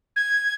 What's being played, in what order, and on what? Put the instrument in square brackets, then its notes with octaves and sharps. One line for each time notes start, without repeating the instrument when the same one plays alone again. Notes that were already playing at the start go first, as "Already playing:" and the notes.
[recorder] G#6